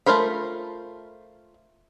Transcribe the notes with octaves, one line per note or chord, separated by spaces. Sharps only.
A3 F4 A#4 C5 B5